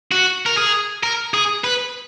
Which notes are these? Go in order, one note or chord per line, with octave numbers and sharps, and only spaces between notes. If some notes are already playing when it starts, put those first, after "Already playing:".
F#4
A#4
G#4
A#4
G#4
B4